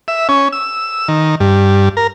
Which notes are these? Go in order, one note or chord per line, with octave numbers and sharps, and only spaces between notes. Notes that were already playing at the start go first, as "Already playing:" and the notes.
E5
C#4
E6
D#3
G2
A#4